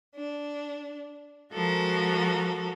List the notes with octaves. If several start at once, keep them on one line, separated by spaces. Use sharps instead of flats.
D4
F3 G#3 F#4 A4 A#4